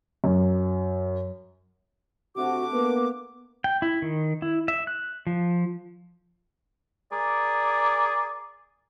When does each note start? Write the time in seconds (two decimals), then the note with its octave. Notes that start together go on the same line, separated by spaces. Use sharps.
0.24 F#2
2.37 C3 A3 D4 F#4 D6
2.72 A#3 B3
3.64 G5
3.82 E4
4.02 D#3
4.42 E4
4.68 E5
4.87 F#6
5.27 F3
7.13 G#4 A#4 D5